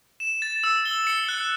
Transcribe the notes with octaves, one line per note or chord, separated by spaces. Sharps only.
E7
A6
E6
G7
C#7
F#6